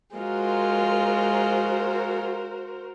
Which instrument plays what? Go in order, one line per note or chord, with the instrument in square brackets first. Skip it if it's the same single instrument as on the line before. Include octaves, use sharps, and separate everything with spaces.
[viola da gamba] G#3 F4 [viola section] F#4 A#4 C5